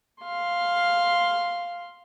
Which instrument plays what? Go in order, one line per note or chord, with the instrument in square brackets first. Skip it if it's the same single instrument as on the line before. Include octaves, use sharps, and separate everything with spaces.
[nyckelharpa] F5 C6